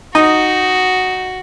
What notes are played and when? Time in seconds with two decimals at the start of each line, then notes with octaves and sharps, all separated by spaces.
0.15 D#4 F#4